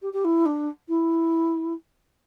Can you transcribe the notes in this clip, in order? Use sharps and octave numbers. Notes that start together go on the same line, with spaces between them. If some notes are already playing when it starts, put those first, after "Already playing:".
G4
G4
E4
D4
E4